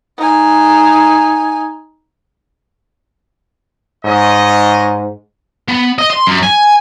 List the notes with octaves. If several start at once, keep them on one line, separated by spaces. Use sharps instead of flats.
D#4 G#5
G#2 C#5 D#5
B3
D#5
C6
F#2
G#5